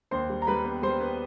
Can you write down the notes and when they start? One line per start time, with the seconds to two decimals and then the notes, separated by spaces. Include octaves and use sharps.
0.11 D#2 C5 C6
0.30 G3
0.42 A#5
0.47 G3 B4 B5
0.65 B3
0.83 G3 C5 C6
1.00 B3